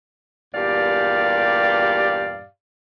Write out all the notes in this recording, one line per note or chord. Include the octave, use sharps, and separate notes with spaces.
E2 G2 A#2 G4 D5 F5